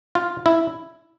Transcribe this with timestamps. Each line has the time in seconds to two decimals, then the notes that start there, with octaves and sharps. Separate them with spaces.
0.15 F4
0.46 E4